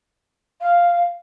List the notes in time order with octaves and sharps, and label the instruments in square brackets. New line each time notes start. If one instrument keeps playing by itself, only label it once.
[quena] F5